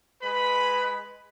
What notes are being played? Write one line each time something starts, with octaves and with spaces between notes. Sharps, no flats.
G#3 B4 B5